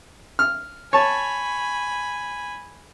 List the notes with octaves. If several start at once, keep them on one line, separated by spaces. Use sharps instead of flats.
F6
C#5 G#5 A5 B5